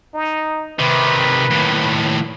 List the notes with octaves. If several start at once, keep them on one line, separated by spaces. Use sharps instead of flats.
D#4
C3 D#3 B4
D#2 A2